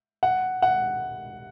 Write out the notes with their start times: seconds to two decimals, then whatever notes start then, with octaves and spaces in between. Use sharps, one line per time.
0.23 F#5
0.62 F#5